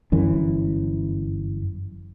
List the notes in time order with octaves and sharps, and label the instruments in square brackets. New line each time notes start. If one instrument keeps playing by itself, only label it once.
[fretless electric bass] G1 F#2 E3